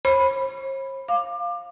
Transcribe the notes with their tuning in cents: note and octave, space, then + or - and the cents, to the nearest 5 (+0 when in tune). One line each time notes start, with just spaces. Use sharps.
C5 +45 B5 +0
F5 +5 D6 +25